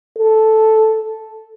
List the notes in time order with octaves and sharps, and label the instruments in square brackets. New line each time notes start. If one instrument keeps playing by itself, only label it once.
[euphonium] A4